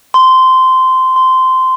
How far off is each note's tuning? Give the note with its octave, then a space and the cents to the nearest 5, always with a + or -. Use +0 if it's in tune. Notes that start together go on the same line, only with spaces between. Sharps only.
C6 -15
C6 -15